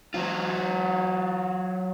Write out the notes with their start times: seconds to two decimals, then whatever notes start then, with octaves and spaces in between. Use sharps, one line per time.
0.14 F#3 F4